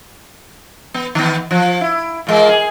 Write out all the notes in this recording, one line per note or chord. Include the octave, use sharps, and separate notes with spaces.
B3
D#3 B3
F3
E4
A#2 G#3 A#3
G#4